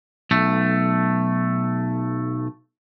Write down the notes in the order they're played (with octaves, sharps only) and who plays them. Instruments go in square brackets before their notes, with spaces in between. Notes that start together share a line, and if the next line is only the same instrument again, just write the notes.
[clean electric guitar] B1 A3